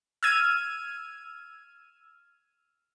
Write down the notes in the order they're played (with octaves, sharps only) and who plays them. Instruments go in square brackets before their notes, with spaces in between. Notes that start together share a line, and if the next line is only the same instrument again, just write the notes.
[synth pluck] E6 F6 G#6 D#7